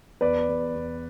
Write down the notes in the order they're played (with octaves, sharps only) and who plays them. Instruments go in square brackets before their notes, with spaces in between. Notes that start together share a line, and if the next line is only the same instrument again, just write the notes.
[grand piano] E2 B4 D5
E2
E2